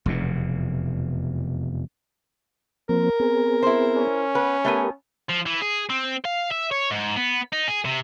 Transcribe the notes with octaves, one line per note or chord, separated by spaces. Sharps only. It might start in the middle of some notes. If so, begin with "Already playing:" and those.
F1 E2 B2
F3 A#3 C4 A#4
B3 C4 G#4
E4 C5
C#4
B3 B4
A3 B3 G4 A#4 G#5
F3
E3
G#4
C4
F5
E5
C#5
G#2
B3
D#4
G#4
C3